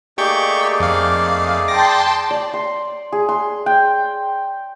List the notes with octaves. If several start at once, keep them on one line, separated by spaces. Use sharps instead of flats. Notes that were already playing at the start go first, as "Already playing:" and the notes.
A3 A#3 D#4 G4 G#4 D5 C#6 G6
F2 F5
G5 A5 C6 D6 D#6 A#6
D5
C6
G#4
C6
G5